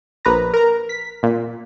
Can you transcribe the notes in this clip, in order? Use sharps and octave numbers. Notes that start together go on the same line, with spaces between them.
A#1 B4 A#5
A#4 A#5
B6
A#2